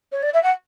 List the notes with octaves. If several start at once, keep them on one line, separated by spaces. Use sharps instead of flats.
C#5
D5
E5
F#5